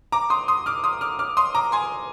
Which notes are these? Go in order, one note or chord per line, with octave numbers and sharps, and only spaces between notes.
A#5 D6
C6 D#6
C6 D#6
D6 F6
C6 D#6
D6 F6
D6 F6
C6 D#6
A#5 D6
G#5 C6